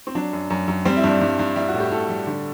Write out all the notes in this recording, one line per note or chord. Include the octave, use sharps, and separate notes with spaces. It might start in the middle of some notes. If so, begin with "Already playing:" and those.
C4
F#3 D4
F#2
F#2
F#2
G3 C4
E4
G2 D4
G2
G2
G3 E4
F#4
A2
G4
A2 A4
G3
D3